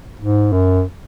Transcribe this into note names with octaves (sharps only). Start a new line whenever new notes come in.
G#2
F#2